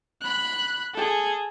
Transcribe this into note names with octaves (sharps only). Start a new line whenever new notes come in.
B5 F#6
G#4 A4